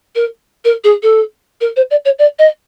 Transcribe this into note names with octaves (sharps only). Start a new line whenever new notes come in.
A#4
A#4
G#4
A4
A#4
C5
D5
C#5
D5
D#5